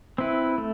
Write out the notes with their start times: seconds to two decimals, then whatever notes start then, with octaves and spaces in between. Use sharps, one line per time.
0.18 C4 E4 B4
0.58 A3